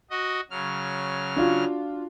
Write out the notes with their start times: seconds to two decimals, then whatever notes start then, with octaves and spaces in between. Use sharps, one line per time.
0.10 F#4 D#5
0.50 C#3 F#3 F6
1.36 D4 F4 F#4